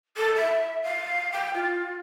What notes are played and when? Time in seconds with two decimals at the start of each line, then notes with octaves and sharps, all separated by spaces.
0.17 A4
0.35 E5
0.83 F5
1.32 G5
1.54 F4